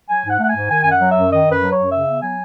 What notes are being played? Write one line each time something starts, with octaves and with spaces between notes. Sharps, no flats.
F#3 G#5
G#2
F#5
A3
F#5
G#2 G#5
D#3 G#5
F#2 G#5
F#5
F#3
F#2 E5
D#3 D#5
F#2
B4
F#3
C#5
F#2
C#3 E5
B3
F#3 G#5